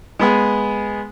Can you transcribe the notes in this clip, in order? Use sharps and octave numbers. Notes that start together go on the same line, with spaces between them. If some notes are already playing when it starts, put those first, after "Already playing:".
G#3 B3 G#4